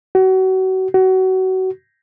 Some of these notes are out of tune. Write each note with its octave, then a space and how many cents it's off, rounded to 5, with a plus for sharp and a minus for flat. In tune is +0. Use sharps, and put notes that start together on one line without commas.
F#4 +30
F#4 +25